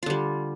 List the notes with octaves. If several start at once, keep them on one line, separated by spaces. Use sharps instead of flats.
D3 G3 F4